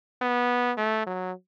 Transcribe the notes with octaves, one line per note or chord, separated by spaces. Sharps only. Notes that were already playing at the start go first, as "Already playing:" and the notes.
B3
A3
F#3